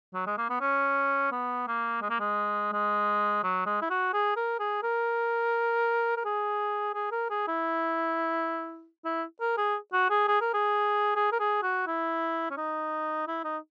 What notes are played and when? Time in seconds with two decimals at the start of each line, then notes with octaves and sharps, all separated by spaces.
0.14 F#3
0.27 G#3
0.38 A#3
0.50 B3
0.61 C#4
1.32 B3
1.67 A#3
2.02 G#3
2.10 A#3
2.19 G#3
2.72 G#3
3.43 F#3
3.66 G#3
3.82 E4
3.90 F#4
4.13 G#4
4.36 A#4
4.59 G#4
4.83 A#4
6.17 A#4
6.25 G#4
6.94 G#4
7.11 A#4
7.30 G#4
7.47 E4
9.05 E4
9.41 A#4
9.57 G#4
9.93 F#4
10.10 G#4
10.28 G#4
10.41 A#4
10.54 G#4
11.16 G#4
11.32 A#4
11.40 G#4
11.63 F#4
11.87 E4
12.51 C#4
12.57 D#4
13.27 E4
13.44 D#4